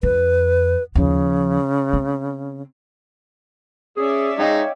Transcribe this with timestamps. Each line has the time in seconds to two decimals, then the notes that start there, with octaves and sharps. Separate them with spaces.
0.03 F2 B4
0.95 D#2 C#3 F3
1.93 C4
3.97 C#4 G#4 D5 E5
4.39 G#3 D#4 C#5 D#5 F5 G5